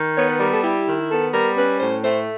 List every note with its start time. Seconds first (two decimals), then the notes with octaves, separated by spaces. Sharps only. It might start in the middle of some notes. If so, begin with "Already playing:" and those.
Already playing: D#3
0.17 B3 C#5
0.28 B4
0.40 G3 A#4
0.52 A4
0.63 E4 G4
0.87 D#3
1.10 B3 A4
1.33 G3 A#4
1.57 C#4 B4
1.80 A2 C5
2.03 A3 C5